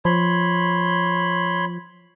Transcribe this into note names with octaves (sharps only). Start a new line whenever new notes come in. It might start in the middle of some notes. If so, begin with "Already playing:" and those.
F3 C#5 B5 C6